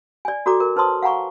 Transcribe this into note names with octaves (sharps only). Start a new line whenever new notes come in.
D5 G#5
F#4 A4 D5 A#5 D6
A#4 D6
D#4 B4 C5 A5 C6 D#6
F5 F#5 G#5 A#5 C#6